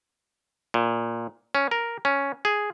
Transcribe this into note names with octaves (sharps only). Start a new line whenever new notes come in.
A#2
C#4
A#4
C#4
G#4